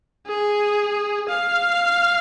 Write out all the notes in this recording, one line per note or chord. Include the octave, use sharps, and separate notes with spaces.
G#4
F5